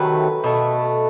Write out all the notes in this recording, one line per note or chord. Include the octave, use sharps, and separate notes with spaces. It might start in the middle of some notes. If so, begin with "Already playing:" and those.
Already playing: C3 D#3 F#3 A3 B4
B2 A3